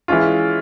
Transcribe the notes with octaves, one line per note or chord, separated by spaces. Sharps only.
E3 G#3 C#4 F4